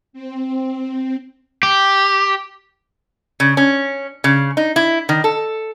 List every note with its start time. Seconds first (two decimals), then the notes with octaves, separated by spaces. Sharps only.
0.13 C4
1.63 G4
3.40 C#3
3.57 C#4
4.24 C#3
4.57 D#4
4.76 E4
5.09 D#3
5.24 A4